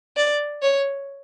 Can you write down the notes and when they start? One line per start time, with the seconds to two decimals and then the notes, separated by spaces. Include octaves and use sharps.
0.17 D5
0.62 C#5